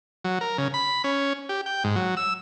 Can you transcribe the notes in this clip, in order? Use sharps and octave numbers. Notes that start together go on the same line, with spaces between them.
F#3
A#4
C#3
B5
C#4
G4
G5
G#2
F#3
E6